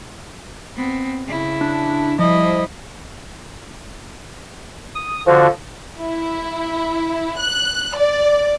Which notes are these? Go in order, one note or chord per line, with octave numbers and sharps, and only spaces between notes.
B3 C4
C#3 E4
D4
F3 G3 E4 D#5
D#6
D3 F3 F#4
E4
F#6
D5